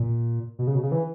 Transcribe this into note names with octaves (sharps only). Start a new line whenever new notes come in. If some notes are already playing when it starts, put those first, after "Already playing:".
Already playing: A#2
B2
C#3
B2
C#3
E3